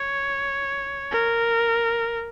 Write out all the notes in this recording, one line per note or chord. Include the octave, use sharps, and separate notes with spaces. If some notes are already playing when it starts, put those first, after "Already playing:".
Already playing: C#5
A#4